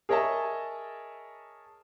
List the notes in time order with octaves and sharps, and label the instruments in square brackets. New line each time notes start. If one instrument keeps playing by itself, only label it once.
[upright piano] G#4 A#4 C#5 D#5 E5 A5